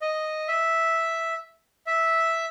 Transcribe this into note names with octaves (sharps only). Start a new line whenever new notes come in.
D#5
E5
E5